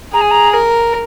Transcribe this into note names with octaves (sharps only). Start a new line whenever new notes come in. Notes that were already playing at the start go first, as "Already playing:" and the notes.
G#4 A#5
G#5
A#5
A#4